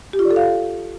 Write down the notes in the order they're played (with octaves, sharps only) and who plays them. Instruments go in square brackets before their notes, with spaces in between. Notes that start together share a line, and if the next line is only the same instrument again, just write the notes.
[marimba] G4
F4
D5
A4
F5